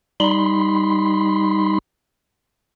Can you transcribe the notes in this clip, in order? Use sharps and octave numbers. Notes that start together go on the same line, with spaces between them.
G3 D#4 B5 C6